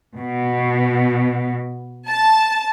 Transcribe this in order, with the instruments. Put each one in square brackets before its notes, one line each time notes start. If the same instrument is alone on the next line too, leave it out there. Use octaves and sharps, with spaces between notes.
[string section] B2
A5